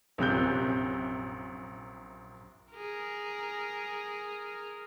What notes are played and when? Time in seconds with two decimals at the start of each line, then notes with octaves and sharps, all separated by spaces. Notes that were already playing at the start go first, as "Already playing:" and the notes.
0.18 A#1 F#2 C3 F#6 G6
2.73 G#4 A#4